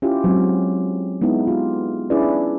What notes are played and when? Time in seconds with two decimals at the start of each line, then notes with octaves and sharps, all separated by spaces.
0.02 C#4 E4 F4 G4
0.24 F#3 G#3 C4
1.22 G#3 B3 D#4 E4
1.47 F4 G4
2.10 C#4 D4 E4 G#4 B4 D5